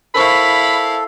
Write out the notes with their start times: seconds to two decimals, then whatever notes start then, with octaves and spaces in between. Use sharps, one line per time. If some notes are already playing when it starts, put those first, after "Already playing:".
0.15 E4 A4 A#4 C5 F5 B5 C#6